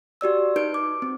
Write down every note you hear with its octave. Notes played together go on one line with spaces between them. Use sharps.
F#4 G4 D5 E6
D#4 B4 G6 D7
D6
C4